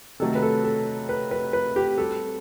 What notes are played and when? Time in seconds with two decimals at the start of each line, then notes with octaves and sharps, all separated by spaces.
0.20 C3 D#3 F#3 A3 A4
0.35 B4
0.42 A4
0.64 A4
1.09 B4
1.31 B4
1.53 B4
1.76 G4
1.97 G3 C4 F#4 A4